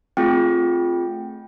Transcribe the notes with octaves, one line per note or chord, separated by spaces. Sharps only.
A3 C4 F4 G#4 G5